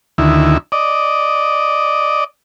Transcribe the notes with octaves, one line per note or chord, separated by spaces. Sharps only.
D2 D#3 E4
D5 D#5